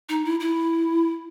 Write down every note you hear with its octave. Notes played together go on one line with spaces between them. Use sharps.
D#4
E4
E4